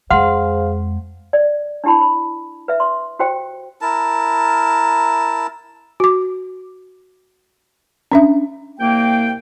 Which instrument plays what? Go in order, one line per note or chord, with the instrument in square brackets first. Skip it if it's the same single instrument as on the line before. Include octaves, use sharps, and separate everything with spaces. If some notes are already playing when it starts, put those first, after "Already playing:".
[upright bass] F2 G#3 [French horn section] G#4 C5 [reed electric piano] F5 [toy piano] F#5 C6
[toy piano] D5
D4 E4 G4 A5 B5
B5
B4 E5
C6
F#4 G4 C5 G5
[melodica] E4 A#4 A5
[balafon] F#4 D6
C#4 D4 E5
[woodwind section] C2 A#3 G5